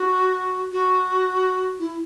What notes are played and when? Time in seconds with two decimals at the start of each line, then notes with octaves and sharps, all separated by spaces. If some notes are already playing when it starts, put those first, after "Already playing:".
Already playing: F#4
0.72 F#4
1.79 E4